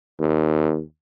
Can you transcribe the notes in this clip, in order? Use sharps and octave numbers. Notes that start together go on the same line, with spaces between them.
D#2